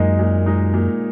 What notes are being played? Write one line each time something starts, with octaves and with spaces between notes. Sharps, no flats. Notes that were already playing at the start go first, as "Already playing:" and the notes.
Already playing: F#2 A#2 G#3 D#4
A#2
G#3 D#4
A#2